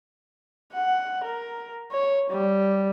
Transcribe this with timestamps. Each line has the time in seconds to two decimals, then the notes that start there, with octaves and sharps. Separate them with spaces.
0.73 F#5
1.24 A#4
1.92 C#5
2.30 G3